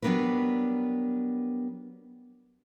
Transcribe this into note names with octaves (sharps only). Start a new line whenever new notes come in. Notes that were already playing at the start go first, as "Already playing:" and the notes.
F#3 G3 B3 D4 A#4 B4